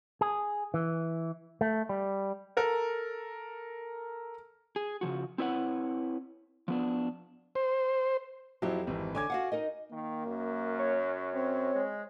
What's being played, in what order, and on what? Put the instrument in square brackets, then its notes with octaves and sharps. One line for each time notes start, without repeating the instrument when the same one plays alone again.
[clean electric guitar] G#4
E3
A3
G3
[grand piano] A4 A#4
[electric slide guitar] G#4
C#3 F3 F#4
C4 E4 B4 C#5 F#5
F3 B3 D4
[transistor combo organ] C5
[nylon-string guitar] F2 G4 [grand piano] F3 F#3 E4
[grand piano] G#1 E3
[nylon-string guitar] D3 C#5 [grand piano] G#5 D6 G#6
[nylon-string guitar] F#4 F5 F#5
D#4 A#4 D#5
[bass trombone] D#3 [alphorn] A#3
[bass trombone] F#2
[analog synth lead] C#5
[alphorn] C4
[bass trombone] G#3